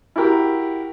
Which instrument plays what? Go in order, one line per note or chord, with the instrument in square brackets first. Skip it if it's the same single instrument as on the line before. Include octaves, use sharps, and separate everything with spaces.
[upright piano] E4 F#4 G4 A#4